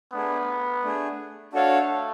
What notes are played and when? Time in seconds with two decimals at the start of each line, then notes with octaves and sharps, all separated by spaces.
0.13 A3 B3 D4 G#4
0.83 A3 D4 G#4
1.53 A3 D4 F#4 A4 C#5 F5